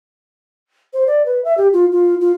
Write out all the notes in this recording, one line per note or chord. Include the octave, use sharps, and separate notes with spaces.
C5
D5
B4
E5
G4
F4
F4
F4